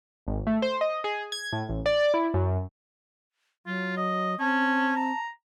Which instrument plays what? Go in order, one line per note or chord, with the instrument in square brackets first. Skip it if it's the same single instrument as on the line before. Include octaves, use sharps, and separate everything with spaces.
[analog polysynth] G#1
A3
C5
D#5
G#4
G#6
A2
A1
D5
E4
F#2
[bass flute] F#3 [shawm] F4
[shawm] D#5
[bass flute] C4 [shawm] C#4 [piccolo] A5
[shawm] A#5